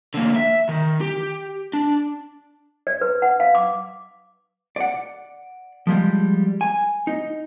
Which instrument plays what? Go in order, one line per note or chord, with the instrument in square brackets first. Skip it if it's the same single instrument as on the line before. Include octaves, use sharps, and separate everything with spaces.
[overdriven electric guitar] D3 A#3
E5
D#3
G4
D4
[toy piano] D5
B4
F#5
F5
D6
[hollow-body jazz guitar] D5 F#5
F3 G3 G#3
G#5
D#4